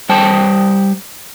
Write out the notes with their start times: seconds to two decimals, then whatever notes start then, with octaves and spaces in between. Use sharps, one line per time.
0.09 G3 C5 G5 A5